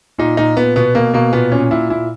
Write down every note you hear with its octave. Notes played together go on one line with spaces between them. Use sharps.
A#2 D#4
A#2 D#4
A#2 B3
B2 B3
B2 A#3
B2 A#3
A#2 B3
A#2 C#4
A#2 E4
A#2 E4